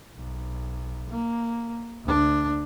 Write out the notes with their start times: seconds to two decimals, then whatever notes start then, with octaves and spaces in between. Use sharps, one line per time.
0.16 B1
1.10 A#3
2.05 D2 D4